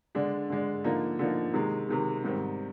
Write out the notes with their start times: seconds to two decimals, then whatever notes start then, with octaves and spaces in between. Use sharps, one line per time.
0.15 D3 G#3 D4
0.50 D3 G#3 D4
0.84 D3 F3 A#3 D#4
1.19 D3 F3 A#3 D#4
1.54 C3 D#3 G#3
1.89 C3 D#3 G#3
2.24 G#2 D#3 G3 C4